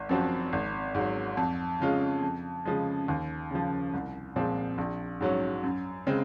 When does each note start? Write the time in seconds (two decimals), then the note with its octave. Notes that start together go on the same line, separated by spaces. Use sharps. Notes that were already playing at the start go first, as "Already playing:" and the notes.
Already playing: G#1
0.09 F#2 F3 C4 F#4
0.53 G#1
0.95 G#2 F#3
1.37 F2
1.80 C#3 G#3 C#4 F4
2.23 F2
2.65 C#3 F3 G#3
3.08 D#2
3.51 C#3 F3
3.94 C2
4.36 A#2 F3 G#3 C4
4.78 A#1
5.21 G#2 F#3 C#4
5.64 F#2
6.07 C#3 G#3 C4